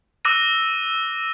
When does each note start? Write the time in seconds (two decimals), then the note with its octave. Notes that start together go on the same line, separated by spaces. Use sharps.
0.25 D6 E6 F#6 A#6 D#7